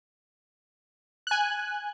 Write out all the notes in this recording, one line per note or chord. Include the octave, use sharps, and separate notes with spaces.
G#5 F#6